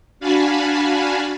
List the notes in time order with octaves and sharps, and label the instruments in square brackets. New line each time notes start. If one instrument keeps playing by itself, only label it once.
[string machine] D4 F#4 F5 G#5 A5 B5